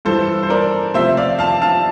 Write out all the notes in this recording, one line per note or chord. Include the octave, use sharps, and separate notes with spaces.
G2 E3 G3 A4 C5
C5
A#4 D5
C3 F3 A3 C4 C5 E5
D5 F5
F5 A5
F5 A5